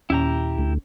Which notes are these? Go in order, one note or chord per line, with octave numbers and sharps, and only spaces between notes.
D#2 A#2 C#4 E4 G4 A#5
D2